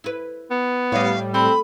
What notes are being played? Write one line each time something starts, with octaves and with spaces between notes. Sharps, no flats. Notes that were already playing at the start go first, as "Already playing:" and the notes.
E4 B4
B3
A2 G3 C#5 D#5 F5
A3 C4 B5